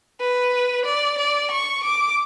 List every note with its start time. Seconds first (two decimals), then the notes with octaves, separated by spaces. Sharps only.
0.20 B4
0.85 D5
1.19 D5
1.51 C#6
1.83 D6